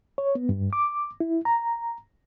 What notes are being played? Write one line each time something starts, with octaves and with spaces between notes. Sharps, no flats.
C#5
B3
G2
D6
E4
A#5